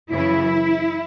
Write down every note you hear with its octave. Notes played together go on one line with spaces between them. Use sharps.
F#2 C#3 E3 E4